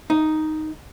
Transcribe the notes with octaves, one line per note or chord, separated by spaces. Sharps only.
D#4